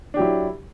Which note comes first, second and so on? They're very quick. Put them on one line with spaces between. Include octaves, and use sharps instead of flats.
D4 G4 F#3 E4